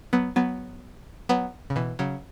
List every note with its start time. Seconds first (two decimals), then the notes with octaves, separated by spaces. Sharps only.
0.13 F#3 B3
0.36 F#3 B3
1.29 F#3 B3
1.70 C#3
1.76 B2 E3
1.99 C#3 F#3